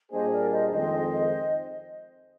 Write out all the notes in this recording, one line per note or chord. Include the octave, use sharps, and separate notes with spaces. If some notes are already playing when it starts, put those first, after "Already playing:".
A#2 G3 A#3 D4 G#4 C5 D#5
C5
A#4 D5
C5 D#5
F2 D#3 G#3 C4 C5 D#5